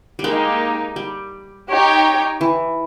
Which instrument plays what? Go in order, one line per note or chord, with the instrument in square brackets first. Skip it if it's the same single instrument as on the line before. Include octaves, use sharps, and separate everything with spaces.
[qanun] G3
[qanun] G#3 [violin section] A#3 D#4 G4
[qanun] G3
[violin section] D#4 G4 C#5 G5
[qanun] E3